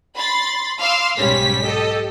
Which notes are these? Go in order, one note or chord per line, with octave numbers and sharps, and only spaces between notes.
B5 C6 A6
F5 C6 D6 E6 F6
B1 G#2 G3 C#4 C#5 B6
G4 A4 D#5